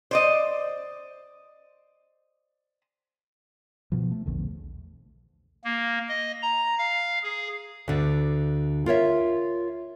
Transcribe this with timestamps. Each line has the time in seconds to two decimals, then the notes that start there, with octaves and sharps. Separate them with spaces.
0.11 C5 D5 D#5
3.92 B2 F3
4.12 A3
4.26 A#1 E2 D3
5.64 A#3
6.08 D#5
6.42 A#5
6.78 F5
7.23 G#4
7.88 D2 D3
8.86 F4 A#4 C#5 E5